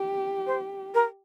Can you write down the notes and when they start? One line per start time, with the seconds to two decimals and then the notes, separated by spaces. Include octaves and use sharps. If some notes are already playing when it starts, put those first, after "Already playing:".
Already playing: G4
0.47 C5
0.94 A#4